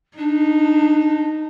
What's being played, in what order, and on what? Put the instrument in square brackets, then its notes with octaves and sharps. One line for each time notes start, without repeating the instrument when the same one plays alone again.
[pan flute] D4 [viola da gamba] D#4